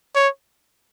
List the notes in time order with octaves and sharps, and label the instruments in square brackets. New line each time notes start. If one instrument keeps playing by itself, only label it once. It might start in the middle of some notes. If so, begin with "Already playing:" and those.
[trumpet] C#5